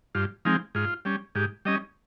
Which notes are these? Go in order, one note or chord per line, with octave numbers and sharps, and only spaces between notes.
G2 F4
F3 G#3 C4 D#4
G#2 F4
G3 C#4
G#2 G4
G3 C#4 D#5